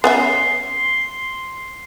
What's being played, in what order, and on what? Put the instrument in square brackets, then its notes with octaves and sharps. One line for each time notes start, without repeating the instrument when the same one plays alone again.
[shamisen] B3 C#4 E5 [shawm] C6